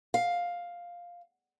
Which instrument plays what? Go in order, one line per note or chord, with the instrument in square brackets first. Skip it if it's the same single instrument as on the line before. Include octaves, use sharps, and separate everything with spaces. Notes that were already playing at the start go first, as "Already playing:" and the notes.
[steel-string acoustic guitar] F5